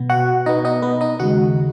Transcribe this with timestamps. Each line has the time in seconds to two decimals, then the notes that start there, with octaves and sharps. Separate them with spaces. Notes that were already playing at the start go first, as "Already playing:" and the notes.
Already playing: B2 B3
0.10 F#4 F#5
0.46 B2 B3 D#4 D#5
0.65 D#4 D#5
0.82 B3 B4
1.01 D#4 D#5
1.20 D#2 C#3 G#3 F#4 F#5